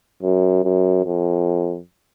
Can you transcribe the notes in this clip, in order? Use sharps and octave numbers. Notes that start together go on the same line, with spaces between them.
F#2
F#2
F2